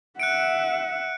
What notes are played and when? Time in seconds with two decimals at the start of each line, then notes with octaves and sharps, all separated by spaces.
0.20 E5 F#5 F#6 C#7 D7